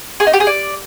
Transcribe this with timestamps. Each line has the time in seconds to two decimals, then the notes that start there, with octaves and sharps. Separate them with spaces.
0.20 G#4
0.27 D#4
0.33 G4
0.40 G#4
0.47 D5